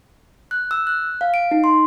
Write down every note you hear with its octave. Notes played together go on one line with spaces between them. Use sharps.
F#6
E6
F#6
F5
D7
D#4
C6